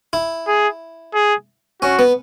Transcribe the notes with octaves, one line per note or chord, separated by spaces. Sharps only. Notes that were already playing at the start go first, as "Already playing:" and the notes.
E4
G#4
G#4
C#4 F#4
B3